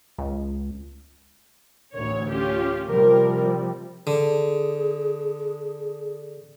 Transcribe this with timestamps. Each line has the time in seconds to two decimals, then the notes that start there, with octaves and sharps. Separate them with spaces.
0.18 C#2
1.94 A1 D2 C#5
2.29 C#4 F4 G4
2.87 C3 F3 G3 A#4
4.07 D3 G#4